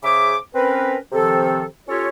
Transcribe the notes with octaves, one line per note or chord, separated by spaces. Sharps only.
C#3 G#4 C5 E5 D6
C4 C#4 A#4 B4
C3 D#3 F3 C4 A4
C#4 F4 G4 A4 C#5